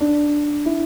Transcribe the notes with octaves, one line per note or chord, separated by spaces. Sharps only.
D4
E4